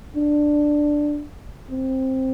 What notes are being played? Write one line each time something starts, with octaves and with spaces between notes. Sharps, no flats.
D4
C4